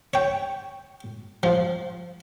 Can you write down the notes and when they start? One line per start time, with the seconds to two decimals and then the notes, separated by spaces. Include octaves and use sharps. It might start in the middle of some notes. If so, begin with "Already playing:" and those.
0.14 C#5 G5
1.43 F3